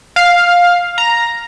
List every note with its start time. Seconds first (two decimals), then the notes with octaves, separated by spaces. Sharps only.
0.16 F5
0.98 A#5